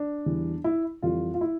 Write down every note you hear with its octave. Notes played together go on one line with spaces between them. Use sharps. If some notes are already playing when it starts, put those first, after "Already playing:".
Already playing: D4
E2 E3 G3
E4
F2 E3 G3 F4
F4
E4